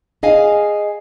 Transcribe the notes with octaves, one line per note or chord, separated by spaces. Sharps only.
G#4 D#5 F5 G#5